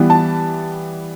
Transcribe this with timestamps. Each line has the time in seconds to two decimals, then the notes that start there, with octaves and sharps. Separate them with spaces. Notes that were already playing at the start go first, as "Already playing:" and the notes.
Already playing: E3 G3 B3
0.10 A5